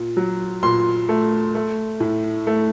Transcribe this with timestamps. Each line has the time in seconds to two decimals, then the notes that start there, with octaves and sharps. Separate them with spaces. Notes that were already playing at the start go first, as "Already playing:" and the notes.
Already playing: A#2
0.17 F#3
0.63 A#2 C6
1.09 A3
1.55 A3
2.00 A2
2.47 A3